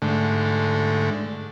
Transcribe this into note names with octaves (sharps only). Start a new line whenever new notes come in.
G#2 D3 A3